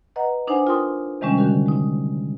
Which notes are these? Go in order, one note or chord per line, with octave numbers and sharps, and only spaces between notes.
B4 D#5 F#5 A#5
D4 D#4 C5 F#5 G#5
F4 A#4 G5 C6 D#6
C3 D#3 G3 G#3 C#4
D3 D#3 G3 C#4 F#4 A#4
G#3 D#4